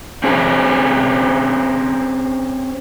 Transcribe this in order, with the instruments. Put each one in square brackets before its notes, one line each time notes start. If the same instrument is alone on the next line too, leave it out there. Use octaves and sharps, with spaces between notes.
[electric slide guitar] C4 C#4 G#4 C5